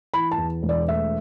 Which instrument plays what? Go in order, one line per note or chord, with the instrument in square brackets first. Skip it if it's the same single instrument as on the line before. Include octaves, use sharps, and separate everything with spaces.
[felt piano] E3 B5
A5
E2
E1
D5
A3 E5